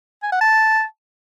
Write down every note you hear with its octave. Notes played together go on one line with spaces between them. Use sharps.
G#5
F#5
A5